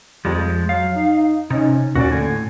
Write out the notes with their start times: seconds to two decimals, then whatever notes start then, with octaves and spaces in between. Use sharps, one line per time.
0.25 F2 F3 G3 G#3
0.69 F#3 F5
0.95 D#4
1.50 C3 C#4 D#4
1.95 D#2 A#2 C#4 F#4 D5
2.11 A2 D3 G#5